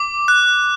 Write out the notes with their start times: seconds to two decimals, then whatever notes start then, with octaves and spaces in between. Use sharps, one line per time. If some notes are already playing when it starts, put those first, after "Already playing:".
Already playing: D6
0.28 F#6